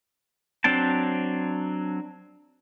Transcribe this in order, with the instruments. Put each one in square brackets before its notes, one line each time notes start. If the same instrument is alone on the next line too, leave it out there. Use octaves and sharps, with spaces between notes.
[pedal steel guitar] F#3 C4 D4 G5 A5